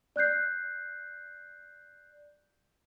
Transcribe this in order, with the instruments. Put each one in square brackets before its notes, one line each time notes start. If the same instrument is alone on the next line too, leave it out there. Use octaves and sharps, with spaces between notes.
[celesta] D5 F#6 G6 C7